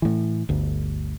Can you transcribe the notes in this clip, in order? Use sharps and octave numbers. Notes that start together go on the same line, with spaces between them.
A2 E3
G1 D2